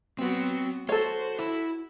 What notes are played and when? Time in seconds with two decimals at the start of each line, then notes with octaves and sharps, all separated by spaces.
0.19 F#3 B3 C4 F#4
0.89 F#4 A4 C5 C#5
1.39 E4